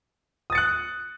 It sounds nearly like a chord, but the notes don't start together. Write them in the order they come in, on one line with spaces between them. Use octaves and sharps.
D#6 A6 C#7 F#6